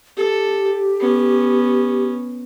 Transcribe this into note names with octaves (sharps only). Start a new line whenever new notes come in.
G4 A4
B3 C#4